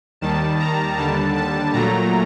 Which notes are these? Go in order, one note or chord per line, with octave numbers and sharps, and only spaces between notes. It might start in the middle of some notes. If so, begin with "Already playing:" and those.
D#2 D#3 G3 A5
A#5
D#2 D3 G3 A5
A5
A#2 F#3 A3 A#5